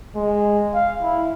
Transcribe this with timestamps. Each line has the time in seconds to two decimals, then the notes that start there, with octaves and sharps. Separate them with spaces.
0.16 G#3
0.74 F5
1.03 E4